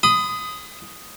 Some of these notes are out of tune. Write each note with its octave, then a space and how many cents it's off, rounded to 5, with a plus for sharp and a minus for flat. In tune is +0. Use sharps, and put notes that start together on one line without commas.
B5 +40 D#6 +0